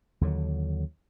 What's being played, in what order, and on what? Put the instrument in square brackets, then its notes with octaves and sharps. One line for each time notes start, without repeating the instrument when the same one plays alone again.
[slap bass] D#2 D3 F#3